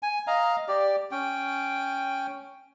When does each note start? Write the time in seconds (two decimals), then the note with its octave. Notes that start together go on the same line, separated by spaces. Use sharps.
0.03 G#5
0.27 D#5 F5 A#5
0.68 G4 D5
1.12 C#4 G5